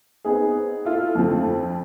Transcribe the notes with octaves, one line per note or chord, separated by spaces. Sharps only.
B3 C4 D#4 G#4
E4 F4 A4
F2 D3 F3 A3 C4